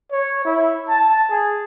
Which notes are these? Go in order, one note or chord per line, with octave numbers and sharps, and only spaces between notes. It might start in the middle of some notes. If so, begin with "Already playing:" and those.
C#5
E4
A5
G#4